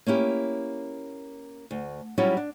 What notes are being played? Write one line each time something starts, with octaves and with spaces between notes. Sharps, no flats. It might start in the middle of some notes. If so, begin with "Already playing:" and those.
A#3 C#4 E4 G4
D2
F#3 G3 C#4 E4 F4
D4